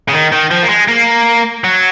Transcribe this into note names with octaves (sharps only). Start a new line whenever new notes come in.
C#3
D#3
D#3
F3
A#3
G#3
A#3
F#3